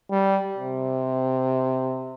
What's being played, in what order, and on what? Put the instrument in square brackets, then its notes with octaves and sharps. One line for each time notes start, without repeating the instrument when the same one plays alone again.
[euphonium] G3
C3